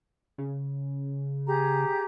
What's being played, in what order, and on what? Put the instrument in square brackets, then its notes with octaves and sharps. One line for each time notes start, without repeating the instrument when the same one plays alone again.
[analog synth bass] C#3
[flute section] G4 G#4 A#5